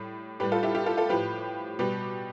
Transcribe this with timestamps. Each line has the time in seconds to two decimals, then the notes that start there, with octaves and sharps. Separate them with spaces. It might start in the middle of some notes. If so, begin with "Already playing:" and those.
Already playing: A2 G3
0.40 A2 G3 G4 B4
0.52 F4 A4
0.63 E4 G4
0.75 E4 G4
0.86 F4 A4
0.97 F4 A4
1.09 A2 F3 G4 B4
1.79 B2 G3 G4 B4